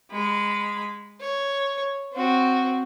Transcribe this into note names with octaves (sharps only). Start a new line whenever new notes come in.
G#3 B5
C#5
C4 F#4